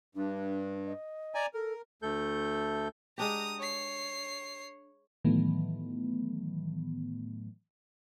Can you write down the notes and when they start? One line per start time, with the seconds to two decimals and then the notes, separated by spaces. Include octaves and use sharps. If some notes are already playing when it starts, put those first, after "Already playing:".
0.15 G2 D4
0.87 D#5
1.35 D5 G#5 A#5
1.54 A4 A#4
2.02 D2 A3 A4 G6
3.18 G#3 D4 G4 A#5 D#6
3.60 C#5 C7
5.25 A2 D#3 E3 F#3 A3 B3